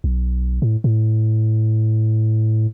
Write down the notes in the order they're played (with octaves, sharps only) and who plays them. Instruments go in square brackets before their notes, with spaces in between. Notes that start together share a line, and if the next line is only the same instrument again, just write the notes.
[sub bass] B1
A2
A2